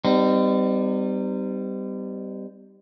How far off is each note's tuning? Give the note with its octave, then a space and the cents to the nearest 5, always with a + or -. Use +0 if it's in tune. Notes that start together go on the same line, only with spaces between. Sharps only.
G3 +0 C4 -45 D#4 -20